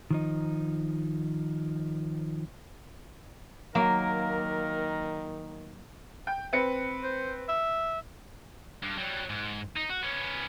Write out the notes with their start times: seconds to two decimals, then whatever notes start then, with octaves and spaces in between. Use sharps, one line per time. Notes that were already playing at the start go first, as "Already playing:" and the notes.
0.11 D#3 F3 D#4
3.75 D#3 F#3 A#3 A#4
6.27 G5
6.53 C4 B4 C#7
7.04 C5
7.48 E5
8.83 G2
8.98 F#3 G3
9.30 G#2
9.76 D#4
9.90 F#4
10.03 B3 C#4